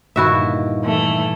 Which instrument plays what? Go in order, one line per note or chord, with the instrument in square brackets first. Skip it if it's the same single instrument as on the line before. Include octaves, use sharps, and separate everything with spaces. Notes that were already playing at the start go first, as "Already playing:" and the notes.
[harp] G2 A#2 D#3 [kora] E4 F#4 E5
[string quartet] E3 A3